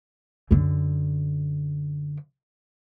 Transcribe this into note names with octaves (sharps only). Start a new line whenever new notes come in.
F#2 D3